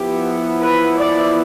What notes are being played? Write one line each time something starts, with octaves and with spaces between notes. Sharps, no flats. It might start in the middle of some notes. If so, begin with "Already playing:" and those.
Already playing: F3 B3 E4 G4
B4
D5